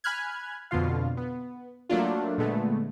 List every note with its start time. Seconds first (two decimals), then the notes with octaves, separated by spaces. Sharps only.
0.04 G#5 B5 F6 F#6 G#6
0.71 F2 B2 D3 F4 F5
1.17 B3
1.90 F#3 A3 A#3 D4 F4
2.38 A#2 D3 G#3 A3 B3